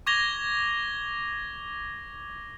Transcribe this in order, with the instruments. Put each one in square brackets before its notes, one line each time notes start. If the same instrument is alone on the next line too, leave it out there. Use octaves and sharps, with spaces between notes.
[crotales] C#6 D6 G#6 A#6 F7 G7